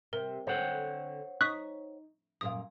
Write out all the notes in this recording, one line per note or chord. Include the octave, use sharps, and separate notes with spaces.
C3 A#4
D3 C4 C5 C#5 F#5
D#4 C#6 D#6 F#6 B6
F#2 A#2 F5 D#6